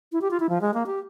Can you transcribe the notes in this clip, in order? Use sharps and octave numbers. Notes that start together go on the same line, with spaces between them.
E4
G4
F4
E4
F3
G#3
A#3
G4